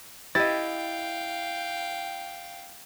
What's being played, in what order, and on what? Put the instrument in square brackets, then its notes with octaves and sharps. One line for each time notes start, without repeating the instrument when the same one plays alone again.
[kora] E4 [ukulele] G4 D#5 [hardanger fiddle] F5 G5 [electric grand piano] A6